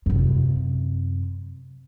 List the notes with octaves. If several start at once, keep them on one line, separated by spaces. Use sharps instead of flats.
F#2 C3